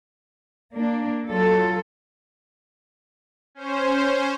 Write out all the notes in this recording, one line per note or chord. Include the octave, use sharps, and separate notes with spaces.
A#3 D4
F#3 F4 A4
C#4 C5